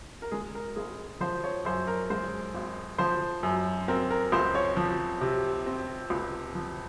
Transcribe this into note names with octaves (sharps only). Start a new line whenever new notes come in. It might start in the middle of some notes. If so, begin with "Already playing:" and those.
A#4
G#3 G#4
A#4
G#1 G#4
F3 C5
C#5
F#2 C5
A#4
G#3 C5
G#1
F3 C5
F#2
C4 A#4
A#4
C#2 C5
C#5
F3
C3
C4
C#2
F3